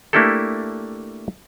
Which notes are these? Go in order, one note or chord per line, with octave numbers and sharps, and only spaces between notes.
A3 A#3 D4 E4 G4 A4